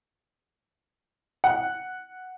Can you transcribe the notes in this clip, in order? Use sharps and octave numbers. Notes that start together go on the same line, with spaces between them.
F#5